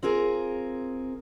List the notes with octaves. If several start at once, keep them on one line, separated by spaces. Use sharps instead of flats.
C4 F4 G#4 A#4